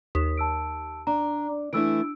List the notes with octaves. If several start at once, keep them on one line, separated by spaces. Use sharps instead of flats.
D#2 D#6 B6
A5 E6 D7
D4 A#5
E3 A3 D4 E4 E6 D7